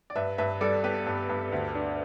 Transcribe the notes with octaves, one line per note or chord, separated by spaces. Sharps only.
D5
G2 B4 E5
G2 B4 E5
G3 A4 D5
B3 G4 B4
G2
G2
D2
D4